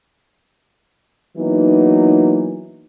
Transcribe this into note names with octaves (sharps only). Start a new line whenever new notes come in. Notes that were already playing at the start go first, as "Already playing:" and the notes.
E3 F#3 A#3 B3 D#4